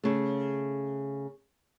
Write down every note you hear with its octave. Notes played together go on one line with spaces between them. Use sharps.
C#3 A3